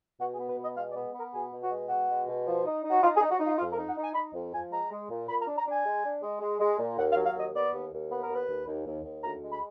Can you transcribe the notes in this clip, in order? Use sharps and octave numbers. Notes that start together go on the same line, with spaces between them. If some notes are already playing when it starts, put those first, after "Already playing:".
B2 F#4
G#4
B3
B4
B2
D#5
G#3 F5
D5
B3
B3 A#4
B2 G#4
B2
F#4
G#3
B2 F#4
G#3
B2
F3
D#4
D#4
F#4
D#4 F4
G#4
D#4
F#4
D#4 F4
F2 F4
A#4
D#4
F#5
D#4 G#5
D#4 B5
F2
F3 G#5
G#3 A#5
G#3
A#2
A#2 B5
A#5
D4
A#5
D4
G#5
G#3
D4
G#3
G#3
G#3
A#2
D#2 F#5
F5
F#3
F5
D#2 D#5
B3 D5
D#2
D#2
B3 B4
A#4
D#2
B4
D#2
D#2
D#2
D#2
D2 A#5
G#3
B5